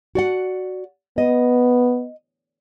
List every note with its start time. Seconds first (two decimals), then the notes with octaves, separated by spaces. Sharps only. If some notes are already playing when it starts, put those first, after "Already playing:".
0.15 F#4 D5 F#5
1.18 B3 D#5